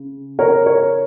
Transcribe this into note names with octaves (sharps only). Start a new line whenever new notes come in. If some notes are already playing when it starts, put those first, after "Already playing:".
Already playing: C#3
A#4 C#5
A#4 C#5